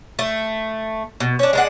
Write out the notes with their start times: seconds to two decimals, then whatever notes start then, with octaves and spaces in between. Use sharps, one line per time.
0.19 A3
1.20 B2
1.39 C#4 D4
1.53 G#3 D4 F#5